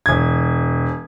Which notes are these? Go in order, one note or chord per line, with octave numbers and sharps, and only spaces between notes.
E1 G#6